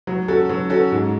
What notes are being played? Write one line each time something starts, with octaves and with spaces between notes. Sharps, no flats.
F#3
C#4 F#4 A4
F#3
C#4 F#4 A4
G#2